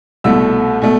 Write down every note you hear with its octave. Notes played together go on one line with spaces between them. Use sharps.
C2 B2 A3 E6
B2 A3